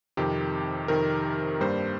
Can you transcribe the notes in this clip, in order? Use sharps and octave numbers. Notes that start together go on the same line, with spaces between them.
F2 C3 D#3 G4
F2 C3 D#3 A#4
G2 G3 A#3 C5